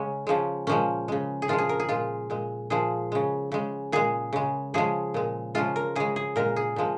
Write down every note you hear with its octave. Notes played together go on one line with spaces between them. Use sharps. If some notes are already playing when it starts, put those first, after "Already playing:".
Already playing: C#3 G#3 C#4
C#3 F3 G#3
A#2 F3 G#3 C#4
C#3 G#3
G#4
A#2 F3 G#3 F4
G#4
A#4
G#4
A#2 G#3 F4
A#2 G#3
A#2 F3 G#3 G#4
C#3 G#3
C#3 G#3
A#2 G#3 G#4
C#3 G#3
C#3 F3 G#3 G#4
A#2 G#3
C#3 F3 G#3 F4
A#4
C#3 G#3 G#4
G#4
A#2 G#3 A#4
G#4
A#2 F3 G#3